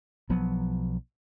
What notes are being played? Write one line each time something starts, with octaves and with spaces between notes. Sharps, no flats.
B1 F3 F#3 B3